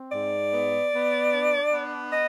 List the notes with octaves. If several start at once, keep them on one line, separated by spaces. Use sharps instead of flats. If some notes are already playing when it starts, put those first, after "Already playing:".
Already playing: C4
G#2 D5
B3
B3
D4
B3
D#5